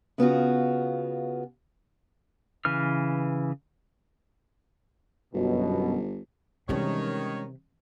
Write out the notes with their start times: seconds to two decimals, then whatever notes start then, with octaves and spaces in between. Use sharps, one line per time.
0.18 C#3 B3 F4 F#4
2.65 C#3 E3 B4 F6
5.34 G1 F#2 B2
6.69 C3 D#3 E3 G3 G#3 C#4 A4 C#5